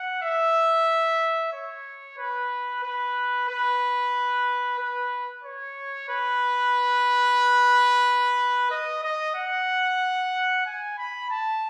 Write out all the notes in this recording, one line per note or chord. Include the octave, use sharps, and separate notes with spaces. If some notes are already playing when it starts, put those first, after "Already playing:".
Already playing: F#5
E5
C#5
B4
B4
B4
B4
C#5
B4
D#5
D#5
F#5
G#5
B5
A5